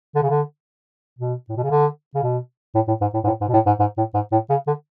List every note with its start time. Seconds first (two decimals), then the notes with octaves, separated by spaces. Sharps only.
0.15 D3
0.22 C#3
0.30 D3
1.19 B2
1.49 A2
1.57 B2
1.63 C#3
1.70 D3
2.15 C#3
2.23 B2
2.75 A2
2.88 A2
3.01 G#2
3.14 A2
3.24 G#2
3.27 A2
3.41 G#2
3.48 B2
3.53 A2
3.66 G#2
3.79 G#2
3.97 A2
4.14 G#2
4.32 A2
4.50 C#3
4.67 D3